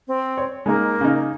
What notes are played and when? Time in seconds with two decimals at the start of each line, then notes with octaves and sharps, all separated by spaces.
0.08 C4
0.37 C#5
0.66 G#3 A#3 D#4 A#4
1.01 C#3 D#4